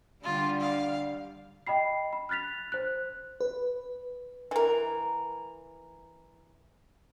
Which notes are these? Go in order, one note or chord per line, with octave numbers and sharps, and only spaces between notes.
D3 G3 F4
F5
D#5 G5 B5 C7
B5
F6 F#6 A6 B6 F7
C5 F#6
B4
E3 A#4